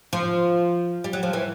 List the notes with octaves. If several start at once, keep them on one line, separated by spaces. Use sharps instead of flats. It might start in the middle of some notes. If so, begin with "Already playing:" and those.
F3
G3
F#3
F3
E3